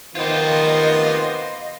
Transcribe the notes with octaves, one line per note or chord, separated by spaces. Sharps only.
D#3 B3 F4 G4 C5 D#5 F5 C6